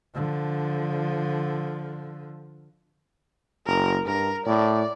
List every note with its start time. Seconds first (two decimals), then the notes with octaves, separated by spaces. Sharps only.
0.15 D3 F3
3.67 F#1 A#4
4.06 G2 A#4
4.46 A2 D5